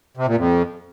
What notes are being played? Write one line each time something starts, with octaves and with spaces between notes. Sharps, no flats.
C3
A#2
F2